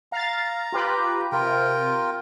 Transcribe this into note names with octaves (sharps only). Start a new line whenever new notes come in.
F5 A#5 A6
F4 G4 B4
C3 F4 A#4 G5